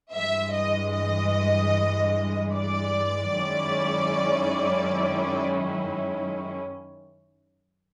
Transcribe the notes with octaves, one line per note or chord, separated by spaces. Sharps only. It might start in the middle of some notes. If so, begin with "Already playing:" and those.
G2 E3 G#3 E5
D#5
D#5
D5
F#2 D#3 G#3 C#4 E4